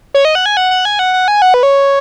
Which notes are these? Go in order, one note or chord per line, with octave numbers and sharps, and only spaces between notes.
C#5
D#5
F#5
G#5
F#5
F#5
G#5
F#5
F#5
G#5
F#5
B4
C#5